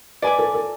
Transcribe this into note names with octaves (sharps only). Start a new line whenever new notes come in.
B4 D5 G#5 B5 D6
A4
A4